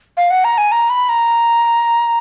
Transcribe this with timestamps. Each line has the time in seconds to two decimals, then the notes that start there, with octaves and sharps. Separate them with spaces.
0.17 F5
0.30 F#5
0.44 A#5
0.58 G#5
0.72 A#5
0.90 B5
1.09 A#5